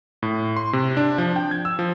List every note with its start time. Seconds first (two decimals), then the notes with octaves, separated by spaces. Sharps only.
0.23 A2
0.56 C6
0.73 C3
0.97 D4
1.18 F3
1.36 G5
1.51 G#6
1.65 E6
1.79 F3